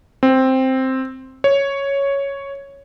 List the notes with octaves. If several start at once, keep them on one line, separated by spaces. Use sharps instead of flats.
C4
C#5